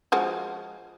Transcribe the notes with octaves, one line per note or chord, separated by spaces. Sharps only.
F3 G#3 F#4